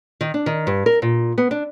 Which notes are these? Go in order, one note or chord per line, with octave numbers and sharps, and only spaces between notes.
D#3
D4
D#3
G2
A#4
A#2
B3
D4